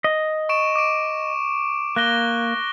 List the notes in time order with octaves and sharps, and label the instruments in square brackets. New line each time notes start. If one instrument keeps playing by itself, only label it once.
[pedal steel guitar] D#5
[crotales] C#6 D7 E7
D6 D7
[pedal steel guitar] A#3 [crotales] F#6 A#6 G7